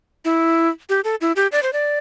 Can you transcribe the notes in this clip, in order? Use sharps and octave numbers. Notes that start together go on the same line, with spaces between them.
E4
G4
A4
E4
G4
D5
C5
D5